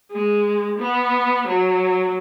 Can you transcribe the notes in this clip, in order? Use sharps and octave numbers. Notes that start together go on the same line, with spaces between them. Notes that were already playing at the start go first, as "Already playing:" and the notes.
G#3
B3
F#3